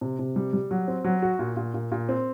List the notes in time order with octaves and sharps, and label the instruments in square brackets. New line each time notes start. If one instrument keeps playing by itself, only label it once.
[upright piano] C3
C3
G3
G3
F#3
C4
F#3
F#4
A#2
A#2
A#2
A#2
C4